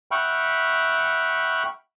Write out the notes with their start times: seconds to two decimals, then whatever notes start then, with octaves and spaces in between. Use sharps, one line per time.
0.11 E5 F#5 G5 B5 C#6 F6